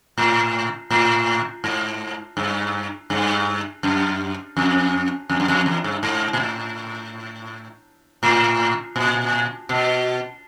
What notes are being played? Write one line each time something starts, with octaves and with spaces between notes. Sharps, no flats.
A2
A2
G#2
G2
G2
F#2
F2
F2
F#2
F2
E2
G2
G#2
A#2
A2
A2
A#2
B2